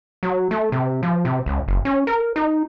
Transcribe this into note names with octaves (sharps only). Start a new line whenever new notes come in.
F#3
A3
C3
F3
C3
C#2
F#1
C#4
A#4
D#4